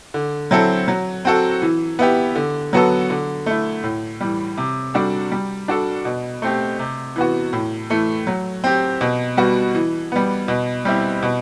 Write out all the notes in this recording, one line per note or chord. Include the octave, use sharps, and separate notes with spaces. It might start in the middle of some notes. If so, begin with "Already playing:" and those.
D3
F#3 C4 E4 A4
F#3
C4 F#4 A4
E3
B3 E4 G4
D3
F#3 B3 F#4 A4
D3
A3 E4
A2
E3 G3
C3
G3 D4 F#4 A4
G3
D4 F#4 A4
B2
A3 C4 G4
C3
E3 B3 F#4
A2
E3 A3
F#3
C4 G4
B2
G3 B3 F#4
E3
G3 B3
B2
G3 C4 E4 G4
B2